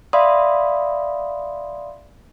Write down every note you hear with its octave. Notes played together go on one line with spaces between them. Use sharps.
D5 E5 F5 B5 C6 D#6